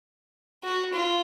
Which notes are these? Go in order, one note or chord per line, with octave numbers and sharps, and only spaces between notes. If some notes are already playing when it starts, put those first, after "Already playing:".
F#4
F4